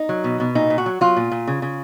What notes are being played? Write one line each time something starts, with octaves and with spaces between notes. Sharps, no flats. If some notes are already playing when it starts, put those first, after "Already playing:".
Already playing: D#4
F#3
B2
B2
A#2 D#4
A#2
F#4
F#3
F#3 F4
A#2
A#2
C#3
C#3